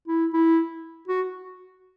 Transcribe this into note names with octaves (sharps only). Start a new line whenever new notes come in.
E4
E4
F#4